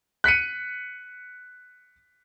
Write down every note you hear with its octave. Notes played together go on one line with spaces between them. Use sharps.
F#6 B6 C#7 D#7